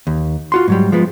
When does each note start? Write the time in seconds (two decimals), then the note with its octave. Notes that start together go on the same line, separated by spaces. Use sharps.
0.07 D#2
0.52 F4 F#4 C6
0.68 G#2 F#3 G3
0.92 F3 G#3 B3 F4